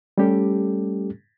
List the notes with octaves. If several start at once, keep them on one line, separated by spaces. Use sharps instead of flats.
G3 A3 C#4 G4 A4